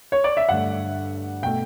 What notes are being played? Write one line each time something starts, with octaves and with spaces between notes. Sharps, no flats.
C#5
D5
E5
G2 D3 A3 F#5
B2 A3 G5